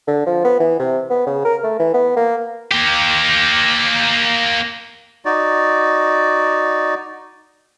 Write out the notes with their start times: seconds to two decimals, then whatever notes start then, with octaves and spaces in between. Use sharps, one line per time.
0.07 D3
0.26 F3
0.45 B3
0.60 E3
0.80 C3
1.10 B3
1.27 C#3
1.45 A#4
1.63 A3
1.79 E3
1.94 B3
2.17 A#3
2.72 A#3 G4
5.25 D#4 F#4 D5